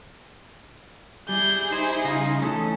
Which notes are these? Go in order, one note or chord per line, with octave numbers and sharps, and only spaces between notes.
G3 E4 G#4 G6
D#4 C5
C#3 F4 D#5
E3 A3 C#4 A4